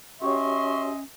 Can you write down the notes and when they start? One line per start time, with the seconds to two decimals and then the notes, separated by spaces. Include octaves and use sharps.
0.22 C#4 F#4 G4 C#5 D#5 E5 C6 C#6